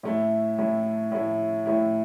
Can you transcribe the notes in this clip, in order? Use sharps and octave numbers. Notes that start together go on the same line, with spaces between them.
A2 A3 E4
A2 A3 E4
A2 A3 E4
A2 A3 E4